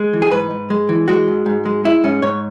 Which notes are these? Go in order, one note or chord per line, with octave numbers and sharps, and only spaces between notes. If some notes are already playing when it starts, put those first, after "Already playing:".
Already playing: G#3
E3
G#4
G#2 B4
G#2
G#3
E3
G#3 F#4
G#2
G#2
G#3
G#3 E4
G#2 C#4
G#2 C#5